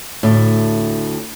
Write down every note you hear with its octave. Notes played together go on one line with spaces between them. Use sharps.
D2 A2